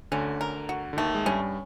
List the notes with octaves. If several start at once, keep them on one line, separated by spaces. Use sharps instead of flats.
D2 D3 C#4
A#4
F#4
D3
D#2 D#3 A3
G#3
G2 G3 C#4